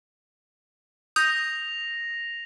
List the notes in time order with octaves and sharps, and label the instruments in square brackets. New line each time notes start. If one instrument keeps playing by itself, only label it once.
[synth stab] D#6 [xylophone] G6 [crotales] A#6 F7